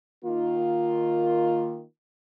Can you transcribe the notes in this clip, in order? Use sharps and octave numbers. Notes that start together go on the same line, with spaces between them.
D#3 A#3 F4